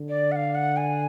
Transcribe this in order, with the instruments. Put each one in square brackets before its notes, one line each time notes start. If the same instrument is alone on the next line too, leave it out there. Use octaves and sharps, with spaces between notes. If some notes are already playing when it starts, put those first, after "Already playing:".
Already playing: [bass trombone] D3
[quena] D5
F#5
F5
F#5
G#5